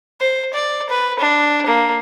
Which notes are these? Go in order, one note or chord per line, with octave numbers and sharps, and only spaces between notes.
C5
D5
B4
D4
A#3